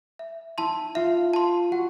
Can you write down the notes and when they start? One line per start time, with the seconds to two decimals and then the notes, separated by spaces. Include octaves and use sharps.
0.19 E5
0.58 E4 A5 C6
0.95 F4 E5
1.34 A5 C6
1.71 F#4 F#5